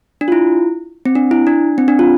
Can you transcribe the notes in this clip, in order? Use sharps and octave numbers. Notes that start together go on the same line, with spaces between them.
D4
F4
E4
C4
D4
E4
D4
C4
D4
F4